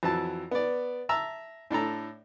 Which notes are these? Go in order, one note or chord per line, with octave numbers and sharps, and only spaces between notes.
F2 E3 F#3 A5
B3 D5
E5 A5 A#5 E6
A2 D4 A4 A#5